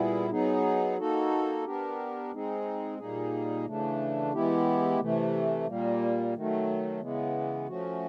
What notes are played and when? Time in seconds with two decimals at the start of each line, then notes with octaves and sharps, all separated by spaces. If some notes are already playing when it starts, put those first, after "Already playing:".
Already playing: A#2 G3 B3 E4 G#4
0.30 F#3 B3 D#4 G#4
0.98 A#3 D#4 F#4 A4
1.65 B3 D4 G4 A#4
2.32 G#3 C4 D#4 G#4
2.98 A#2 G3 A#3 D#4 G#4
3.65 C#3 E3 A3 D4
4.33 E3 G#3 B3 E4 G4
4.99 C3 E3 A3
5.67 A#2 G3 A#3
6.33 D#3 F#3 A3
7.00 C#3 E3 G#3 B3
7.67 F3 A3 C#4 F#4